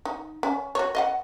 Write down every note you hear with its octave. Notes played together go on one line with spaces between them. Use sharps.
D#4
C#4
F#4 C#5
D#5 F5 F#5